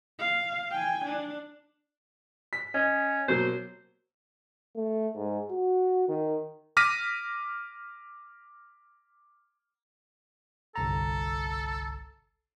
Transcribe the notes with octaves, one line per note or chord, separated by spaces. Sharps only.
F5
G5 G#5
D4
B6
C#4 D#5
B2 F#3 A#3 C5
A3
G#2
F#4
D#3
D6 F6 A#6 B6 D#7
G1 C2 A4 A#5